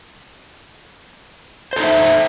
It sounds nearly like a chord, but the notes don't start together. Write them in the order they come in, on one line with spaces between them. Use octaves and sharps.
C5 A4 D#4 E5